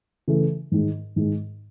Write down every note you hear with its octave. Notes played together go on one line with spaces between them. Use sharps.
C#3 E3 A3
G#2 D#3 G#3
G#2 D#3 G#3